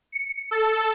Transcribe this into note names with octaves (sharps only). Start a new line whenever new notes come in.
C#7
A4